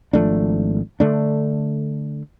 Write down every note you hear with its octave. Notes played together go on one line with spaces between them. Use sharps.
G#1 F3 A3 D4
D3 A3 D4